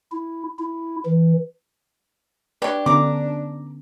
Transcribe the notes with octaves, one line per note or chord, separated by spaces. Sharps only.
E4
E4
E3
D4 G4 B4 C#5
D3 B3 C#4 A#5 D6